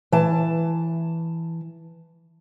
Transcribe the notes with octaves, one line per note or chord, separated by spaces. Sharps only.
E3 A5